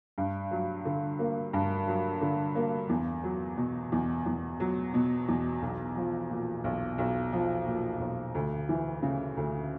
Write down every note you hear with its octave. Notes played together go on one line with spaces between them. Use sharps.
G2
F#3
D3
A#3
G2
F#3
D3
A#3
E2
F#3
B2
E2
E2
F#3
B2
E2
B1
F3
A#2
B1
B1
F3
A#2
B1
D2
E3
C#3
D2